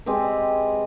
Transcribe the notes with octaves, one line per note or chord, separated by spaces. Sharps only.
G#3 C4 G4 B4